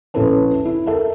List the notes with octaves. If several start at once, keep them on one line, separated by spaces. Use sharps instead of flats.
A#1 C#4 E4 A4 B4 A5
E4
A4 A#4 E5 A5